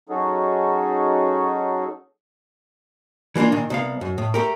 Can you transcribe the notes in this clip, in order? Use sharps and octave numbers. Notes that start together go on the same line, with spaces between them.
F#3 C#4 D#4 F#4 G#4 A4
E3 G3 A#3 D4 F4
A#2 D#3
C2 B3 F5
F#2
A2
A3 G4 A#4